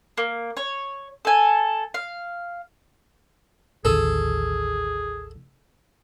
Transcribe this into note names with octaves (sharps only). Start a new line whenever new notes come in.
A#3
C#5
A4 G#5
F5
A1 D#2 D3 G#4 A4